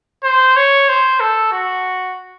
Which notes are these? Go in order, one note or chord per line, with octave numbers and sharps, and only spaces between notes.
C5
C#5
C5
A4
F#4